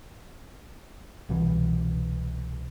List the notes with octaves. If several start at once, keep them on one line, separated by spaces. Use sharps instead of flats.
C2 B2 E3